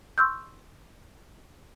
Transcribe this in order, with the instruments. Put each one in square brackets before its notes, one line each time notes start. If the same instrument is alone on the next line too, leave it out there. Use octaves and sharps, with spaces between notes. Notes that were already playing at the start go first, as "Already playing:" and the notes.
[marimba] C6 C#6 E6 F6 G6